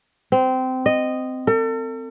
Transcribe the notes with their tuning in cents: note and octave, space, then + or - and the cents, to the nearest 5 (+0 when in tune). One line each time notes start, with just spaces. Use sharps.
C4 -20
D#5 -10
A4 +40